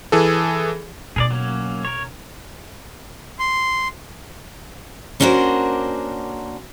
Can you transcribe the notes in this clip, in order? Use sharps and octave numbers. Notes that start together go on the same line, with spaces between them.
E3 G#4 A4
B2 D#4 G#4 A#4 D5
F#3 A#3 C#4
A#4 C#5
C6
A#3 C#4 D4 F#4 A#4 C5